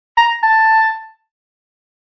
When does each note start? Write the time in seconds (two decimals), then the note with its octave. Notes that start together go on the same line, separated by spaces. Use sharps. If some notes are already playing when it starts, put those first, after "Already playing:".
0.18 A#5
0.43 A5